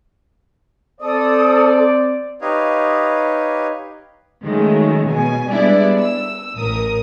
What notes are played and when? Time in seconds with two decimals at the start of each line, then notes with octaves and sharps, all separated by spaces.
1.01 C4 A4 C5 D5 D#6
2.41 D#4 G4 B4 C#5 D#5 F5
4.43 D#3 F#3 G#3 A3 C#4
5.09 B2 G#5
5.49 G3 G#3 B3 D4 E4 D5
6.00 E6
6.54 A1 A2 A#4 D#6